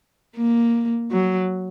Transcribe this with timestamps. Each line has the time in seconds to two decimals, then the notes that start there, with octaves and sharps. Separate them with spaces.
0.37 A#3
1.11 F#3